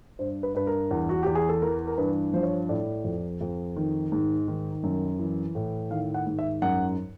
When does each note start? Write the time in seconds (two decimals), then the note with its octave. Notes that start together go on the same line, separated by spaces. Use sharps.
0.19 G2 C5
0.43 B4
0.55 G2 B4
0.67 A#4
0.91 E2
1.09 F#4
1.23 E2 G4
1.35 G#4
1.49 A4
1.62 E3 A#4
1.87 A#4
1.98 G2 B4
2.33 F3 C5
2.43 C#5
2.53 C5
2.69 A2 D5
3.04 F2
3.41 F2
3.76 D#3
4.12 G#2
4.48 D#3
4.83 F#2
5.19 E3
5.55 A2
5.91 D#3 F5
6.14 F#5
6.26 G#2
6.39 E5
6.62 F#2 F#5